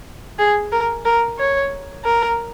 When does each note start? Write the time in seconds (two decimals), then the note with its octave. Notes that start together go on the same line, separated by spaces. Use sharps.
0.39 G#4
0.72 A#4
1.05 A#4
1.39 C#5
2.05 A#4